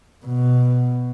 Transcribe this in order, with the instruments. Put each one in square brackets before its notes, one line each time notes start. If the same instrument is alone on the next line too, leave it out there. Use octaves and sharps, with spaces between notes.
[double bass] B2